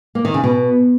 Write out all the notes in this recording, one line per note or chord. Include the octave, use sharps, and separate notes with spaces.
A#3
D#3
C#3
B2